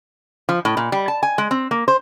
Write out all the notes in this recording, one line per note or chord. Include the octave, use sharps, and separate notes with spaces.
F3
A2
A#2
G3
A5
G#5
G#3
C4
A#3
C5